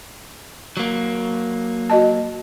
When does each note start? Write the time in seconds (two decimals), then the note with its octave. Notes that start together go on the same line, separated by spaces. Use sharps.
0.77 F#3 A#3
1.90 F#4 D#5 A5